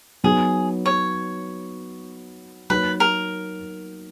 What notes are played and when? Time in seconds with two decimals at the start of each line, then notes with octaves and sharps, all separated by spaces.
0.24 F#3 B3 D#4 G#4
0.86 C#5
2.70 F#3 A#3 D#4 F#4 B4 C#5
3.00 A#4